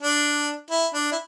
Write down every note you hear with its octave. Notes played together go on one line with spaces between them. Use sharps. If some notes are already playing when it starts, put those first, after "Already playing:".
D4
E4
D4
E4